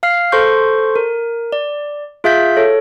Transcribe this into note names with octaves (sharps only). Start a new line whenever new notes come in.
F5 F6 C7
A4 C5 C6 C#6 G6
A#4
D5
F4 G#4 E5 F5 G6 B6
A4 C#5